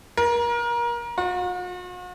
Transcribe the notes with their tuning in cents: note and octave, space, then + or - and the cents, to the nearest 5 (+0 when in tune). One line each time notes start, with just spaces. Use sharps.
A#4 +30
F#4 -45